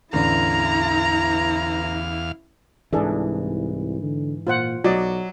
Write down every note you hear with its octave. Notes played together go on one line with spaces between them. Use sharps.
A1 E2 D3 E4 D5 F5 A#5
C2 G#2 E3 D4 G#4 A4
D3
A#2 F4 C5 F#5
B1 F#3 D5 D#5